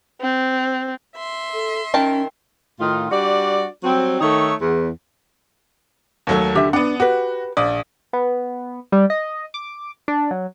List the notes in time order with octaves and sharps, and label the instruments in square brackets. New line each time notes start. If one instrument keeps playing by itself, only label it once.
[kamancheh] C4
[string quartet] E5 C6
[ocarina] A4
[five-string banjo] D#3 A#4 A5 [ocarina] C#4 [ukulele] G5
[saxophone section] A2 D#3 D#4 F4
G3 D4 F#4 D5
F#3 G3 C4
D#3 A3 D#4 A4 C#5
E2
[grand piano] D#2 F#3 A3
[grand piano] D3 [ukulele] G4 E5
[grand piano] B3 F#5 [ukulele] D4
[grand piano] F#4 [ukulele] G4 B4
[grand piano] A#1 D5 D#6
[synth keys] B3
G3
D#5
D6
D4
F#3